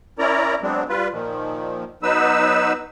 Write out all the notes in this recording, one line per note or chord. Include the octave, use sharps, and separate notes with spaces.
C#4 E4 A#4 D5 A#5
F#3 G#3 B3 C4 D4
G3 F4 B4
A#2 D#3 F3
F#3 B3 D#4 B4 E6